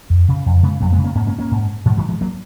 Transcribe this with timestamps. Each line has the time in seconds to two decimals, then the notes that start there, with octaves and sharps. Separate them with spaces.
0.10 F2
0.28 C#3
0.46 F2
0.63 C#3 G#3 B3
0.81 F2 F#3 A#3
0.92 G#3 B3
0.98 C#3
1.04 A#3 C#4
1.15 G#2 A#3 C#4
1.27 A#3 C#4
1.39 A#3 C#4
1.51 G#2
1.85 G#2 F3
1.97 D#3 F#3
2.09 F3 G#3
2.21 F#3 A#3